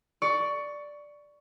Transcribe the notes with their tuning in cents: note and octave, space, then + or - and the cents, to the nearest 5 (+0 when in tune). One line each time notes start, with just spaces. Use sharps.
D5 +0 C#6 +15